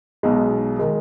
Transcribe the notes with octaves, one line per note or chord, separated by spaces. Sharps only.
B1 B2 G#3 D#4
D#3 G#3